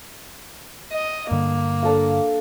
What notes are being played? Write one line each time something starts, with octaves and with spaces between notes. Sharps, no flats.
D#5
G2 D3 A#3
D4 A4 F5